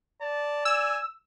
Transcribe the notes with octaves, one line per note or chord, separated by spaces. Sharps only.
D5 A5
G#5 E6